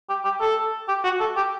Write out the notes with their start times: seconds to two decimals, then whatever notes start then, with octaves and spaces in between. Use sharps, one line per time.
0.09 G4
0.25 G4
0.41 A4
0.88 G4
1.04 F#4
1.20 A4
1.36 G4